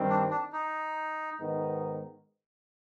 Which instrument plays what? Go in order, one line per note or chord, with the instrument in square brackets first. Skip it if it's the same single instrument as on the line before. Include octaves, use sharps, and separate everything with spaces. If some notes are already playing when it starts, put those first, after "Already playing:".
Already playing: [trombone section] G2 D#3 G3 C4
[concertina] D4
D4
D#4
[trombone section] G#2 D#3 B3 D#4